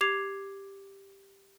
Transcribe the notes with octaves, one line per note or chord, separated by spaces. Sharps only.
G4 D6 G#6 C7 F7